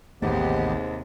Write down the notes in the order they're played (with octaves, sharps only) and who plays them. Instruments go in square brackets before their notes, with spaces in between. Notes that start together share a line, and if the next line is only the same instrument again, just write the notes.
[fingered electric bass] A1 D#3 A3 [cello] D#2 C3 [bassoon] G#2 [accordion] B3 G4